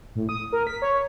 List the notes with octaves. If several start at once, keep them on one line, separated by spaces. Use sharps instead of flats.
A2
D#6
A#4
B6
C#5